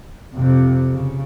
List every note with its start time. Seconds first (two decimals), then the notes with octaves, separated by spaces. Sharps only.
0.34 F2 C3
0.92 C#3